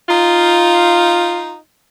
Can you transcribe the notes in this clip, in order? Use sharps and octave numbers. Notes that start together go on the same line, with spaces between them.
D#4 F4